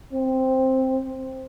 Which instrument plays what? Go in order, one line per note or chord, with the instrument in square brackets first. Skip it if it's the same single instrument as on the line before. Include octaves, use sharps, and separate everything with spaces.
[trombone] C4